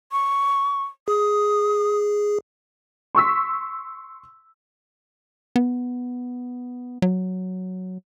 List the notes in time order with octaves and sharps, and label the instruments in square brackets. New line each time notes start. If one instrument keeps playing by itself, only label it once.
[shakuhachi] C#6
[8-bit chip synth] G#4 [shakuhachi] D#6
[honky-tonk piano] C6 C#6 E6 B6
[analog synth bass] B3
F#3